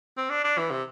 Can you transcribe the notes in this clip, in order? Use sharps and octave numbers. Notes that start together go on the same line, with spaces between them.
C4
D4
D4
E3
C3